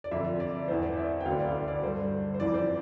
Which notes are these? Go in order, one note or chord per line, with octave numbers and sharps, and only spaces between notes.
D5
F2 D3 E5
D5
E2 E3 C5
D5
E5
G5
D2 D3 F5
D5
D5
D5
G2 D3 C5
C5
F2 E3 D5
C5